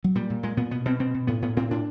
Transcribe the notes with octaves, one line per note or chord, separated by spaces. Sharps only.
F#3
A#2 G3
A#2
A#2 G#3
A#2 B3
B2 B3
B2 C4
B2 C4
B2
A2 B3
A2 B3
A2 C4
A2 D4